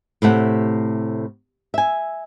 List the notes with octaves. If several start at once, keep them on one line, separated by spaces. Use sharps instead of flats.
A2 C3 A3 F#5
E5 G#5